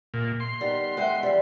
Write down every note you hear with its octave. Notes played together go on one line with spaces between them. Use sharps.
A#2
C6
D#3 G3 B3
G#3 B4 E5 F#5 G5
E3 G3